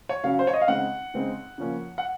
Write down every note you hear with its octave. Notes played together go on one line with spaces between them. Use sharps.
C#5
C#3 F#3 C#4 F5
C5
C#5
D#5
F5
C#3 G#3 C4 D#4 F#5
C#3 G#3 C4 D#4
C#3 F3 A#3 C#4
F#5